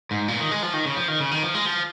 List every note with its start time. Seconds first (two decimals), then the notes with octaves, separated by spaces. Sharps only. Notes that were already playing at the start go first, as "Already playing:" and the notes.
0.11 G#2
0.28 A#2
0.40 D#3
0.51 G#3
0.63 F3
0.73 D#3
0.86 C#3
0.96 F3
1.08 D#3
1.20 C#3
1.31 D#3
1.43 F3
1.54 G#3
1.66 F3